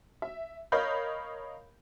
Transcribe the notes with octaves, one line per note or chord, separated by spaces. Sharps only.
E5
A#4 C#5 D#5 F5 B5 G6